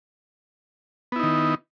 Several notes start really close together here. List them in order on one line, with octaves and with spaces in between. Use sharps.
B3 E4 D#4 D#3